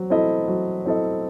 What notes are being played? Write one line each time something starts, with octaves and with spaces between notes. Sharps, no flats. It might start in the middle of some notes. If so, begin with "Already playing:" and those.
Already playing: F#3 C4
C4 E4 A4 D#5
F#3
C4 E4 A4 D#5